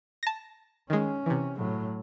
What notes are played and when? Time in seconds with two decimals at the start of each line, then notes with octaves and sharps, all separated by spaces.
0.23 A5 A#6
0.90 D#3 G#3 C#4
1.26 C3 E3
1.57 A2 F#3